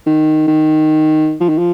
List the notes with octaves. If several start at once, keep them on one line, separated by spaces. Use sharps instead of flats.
D#3
D#3
F3
D#3
F3